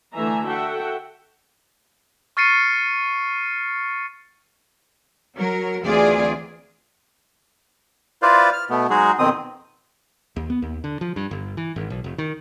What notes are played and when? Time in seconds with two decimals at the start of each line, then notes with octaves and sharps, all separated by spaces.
0.13 D3 E3 A3 E5 G#5 A#5
0.45 F#4 A4 E5 F#5 G5
2.37 C#6 F6 A6 C7 C#7 D#7
5.35 F#3 A#4
5.82 D2 E3 C4 F4 G#4 D5
8.22 E4 F4 B4 C5 D5 F5
8.53 F6
8.70 B2 A3 B3
8.90 F#3 G#3 D#4 F#4 G#4
9.19 F2 B2 D#3 C4 D#6
10.36 D#2
10.50 B3
10.62 D#2
10.84 D3
11.01 F3
11.16 G2
11.31 G1
11.57 E3
11.76 G#1
11.90 B1
12.04 F1
12.18 D#3